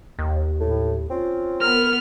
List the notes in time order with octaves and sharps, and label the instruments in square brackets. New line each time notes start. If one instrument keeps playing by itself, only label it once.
[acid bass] D#2
[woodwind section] A2
C4 C#4 F4
[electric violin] B3 F6 [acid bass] A#4